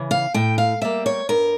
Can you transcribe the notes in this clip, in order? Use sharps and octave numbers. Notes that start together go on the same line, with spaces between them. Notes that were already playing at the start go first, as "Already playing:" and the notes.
Already playing: C#3 E3
F5
A2 G5
F5
G3 A#3 E5
C#5
G2 A#4